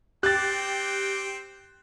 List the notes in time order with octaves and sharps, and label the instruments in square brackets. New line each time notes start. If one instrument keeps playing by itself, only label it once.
[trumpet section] C4 G5 [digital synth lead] G4 [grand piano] F#6 A6